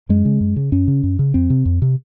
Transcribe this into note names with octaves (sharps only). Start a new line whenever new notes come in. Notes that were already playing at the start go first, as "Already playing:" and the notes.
F#2 G#3
C#3
F#2
C#3
F#2 C#4
C#3
F#2
C#3
F2 C4
C3
F2
C3